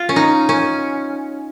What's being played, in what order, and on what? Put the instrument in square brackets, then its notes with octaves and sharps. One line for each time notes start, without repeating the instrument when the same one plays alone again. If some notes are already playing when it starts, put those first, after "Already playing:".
Already playing: [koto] F4
C#4
D#4
C#4